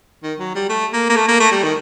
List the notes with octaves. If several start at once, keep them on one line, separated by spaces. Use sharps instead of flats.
D#3
F#3
G3
A3
A#3
A#3
A3
A#3
A3
G3
D#3